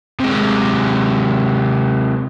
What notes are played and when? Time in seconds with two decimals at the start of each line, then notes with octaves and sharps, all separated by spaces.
0.20 C3 G#3